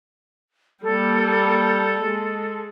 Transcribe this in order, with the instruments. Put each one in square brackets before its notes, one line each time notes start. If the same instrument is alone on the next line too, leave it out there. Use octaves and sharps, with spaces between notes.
[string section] G3 A#3 [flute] A4
[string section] G#3